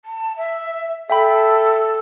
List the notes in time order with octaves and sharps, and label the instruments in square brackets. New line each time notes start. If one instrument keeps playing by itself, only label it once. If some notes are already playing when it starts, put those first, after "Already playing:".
[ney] A5
E5
[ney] A4 [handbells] E5 G5 B5